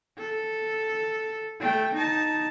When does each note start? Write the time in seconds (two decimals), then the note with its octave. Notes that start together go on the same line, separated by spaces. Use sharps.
0.18 A4
1.60 A3 G5
1.95 D#4 A5